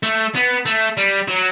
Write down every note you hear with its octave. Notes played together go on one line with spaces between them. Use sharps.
A3
B3
A3
G3
F#3